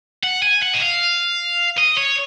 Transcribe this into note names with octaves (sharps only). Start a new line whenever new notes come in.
F#5
G#5
F#5
D#5
F5
D#5
C#5